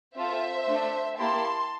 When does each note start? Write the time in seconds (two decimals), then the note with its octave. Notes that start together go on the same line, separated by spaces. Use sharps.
0.16 C4 F4 A4 C5 E5
0.67 A3 D4 A4
1.18 A#3 E4 G4 A5 C6